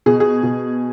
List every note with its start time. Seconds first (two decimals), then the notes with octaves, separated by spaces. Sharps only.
0.06 B2 G#4
0.20 G#4
0.43 B2